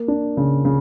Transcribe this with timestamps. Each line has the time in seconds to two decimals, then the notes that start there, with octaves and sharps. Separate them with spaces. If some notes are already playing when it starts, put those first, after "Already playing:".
Already playing: A#3
0.08 D4
0.37 C#3
0.65 C#3